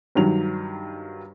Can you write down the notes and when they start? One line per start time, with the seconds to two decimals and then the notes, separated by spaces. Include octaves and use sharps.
0.15 G2 D#3 F#3 F7